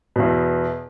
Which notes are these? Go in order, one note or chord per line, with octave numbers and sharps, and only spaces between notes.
E2 B2